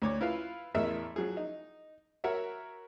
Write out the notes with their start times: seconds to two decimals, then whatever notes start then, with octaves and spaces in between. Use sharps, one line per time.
0.02 D2 C#5 D6
0.21 E4 F4 B4 F5
0.74 A1 E2 A#4 D#5 E5
1.16 F3 F#3 G#4
1.37 D#4
2.24 F#4 A#4 C#5 E5 F#5